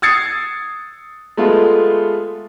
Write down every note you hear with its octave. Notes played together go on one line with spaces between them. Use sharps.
D#6 E6 G#6 A6 C7 C#7
G#3 A3 B3 F4